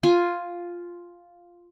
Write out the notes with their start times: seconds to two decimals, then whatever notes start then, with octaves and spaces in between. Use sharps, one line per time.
0.03 F4 G#5